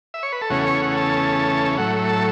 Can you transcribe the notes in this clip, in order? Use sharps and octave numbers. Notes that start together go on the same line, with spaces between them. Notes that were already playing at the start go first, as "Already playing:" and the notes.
E5
C#5
B4
A4
E2 C#3 A3 C#4 F#4
C#5
F#5
A5
A2 F#3 A3 F#5
A5